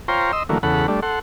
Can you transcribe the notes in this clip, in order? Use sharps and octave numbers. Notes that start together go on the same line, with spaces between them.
F4 C5 C#5 G5 A#5 C6
D#5 C6 E6
D3 E3 F#3 A3 A#3
E2 C#3 A4 F#5 B5
G3 A3 D4
A4 F#5 C6